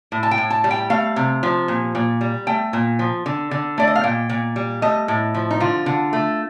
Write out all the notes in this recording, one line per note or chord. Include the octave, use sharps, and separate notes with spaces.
A2
A5
G5
A2
A5
G3
G5
A3 F5
C3
F3
A#2
A#2
G3
A3 G5
A#2
F3
D3
D3
A3 D5
D#5
F5
A#2 G5
A#2
G3
A3 D#5
A2
F3
D#4
D3 F4
D3
A3